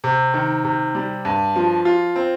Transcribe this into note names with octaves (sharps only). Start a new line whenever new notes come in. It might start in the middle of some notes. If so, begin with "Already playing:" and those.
C3
D#3
C3
G3
G2
F3
F4
C4